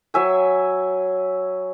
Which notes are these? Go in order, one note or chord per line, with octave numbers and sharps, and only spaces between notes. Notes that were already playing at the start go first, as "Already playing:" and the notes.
F#3 E5 G#5